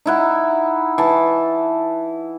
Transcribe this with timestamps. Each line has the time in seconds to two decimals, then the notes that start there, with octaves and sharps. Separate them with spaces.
0.06 D#4 E4 F#5
0.98 E3 A5